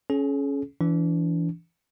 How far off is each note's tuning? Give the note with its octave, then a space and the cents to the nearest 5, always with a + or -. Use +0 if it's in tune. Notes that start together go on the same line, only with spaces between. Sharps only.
C#4 +0 G#4 +45
E3 +15 D4 -30